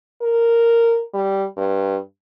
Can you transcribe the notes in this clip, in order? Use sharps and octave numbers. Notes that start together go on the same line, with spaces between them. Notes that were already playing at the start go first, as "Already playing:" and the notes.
A#4
G3
G2